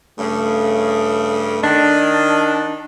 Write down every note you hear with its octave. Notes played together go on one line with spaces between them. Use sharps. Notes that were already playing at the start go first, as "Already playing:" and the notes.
G2 C#3 A3
D#3 D4